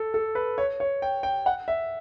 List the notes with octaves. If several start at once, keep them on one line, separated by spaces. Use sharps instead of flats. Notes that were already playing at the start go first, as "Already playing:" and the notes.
Already playing: A4
A4
B4
C#5
C#5
G5
G5
F#5
E5